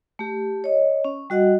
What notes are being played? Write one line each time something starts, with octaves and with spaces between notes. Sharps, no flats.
A3 G4
C#5 D#5
C#4
G3 F#4 D#5 F#5